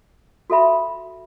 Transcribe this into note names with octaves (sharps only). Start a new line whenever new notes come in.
F#4 A4 E5 B5